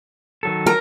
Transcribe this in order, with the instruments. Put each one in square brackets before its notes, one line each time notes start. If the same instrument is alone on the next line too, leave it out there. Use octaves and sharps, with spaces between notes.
[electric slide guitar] D#3 F#3 A4
[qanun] A#4